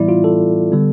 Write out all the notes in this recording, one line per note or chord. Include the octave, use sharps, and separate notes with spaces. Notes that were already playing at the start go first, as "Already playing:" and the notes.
Already playing: A2 E3 G3 B3 E4 D5
F4
A4
D3 G3 B3